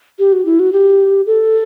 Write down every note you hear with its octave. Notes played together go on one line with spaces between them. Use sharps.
G4
F#4
E4
F#4
G4
A4